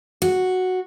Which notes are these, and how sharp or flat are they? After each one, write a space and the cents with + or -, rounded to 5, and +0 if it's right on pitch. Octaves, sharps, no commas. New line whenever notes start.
F#4 -5